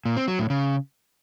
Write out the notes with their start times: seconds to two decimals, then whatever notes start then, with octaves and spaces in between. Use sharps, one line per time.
0.05 A#2
0.17 C4
0.28 F#3
0.39 A2
0.50 C#3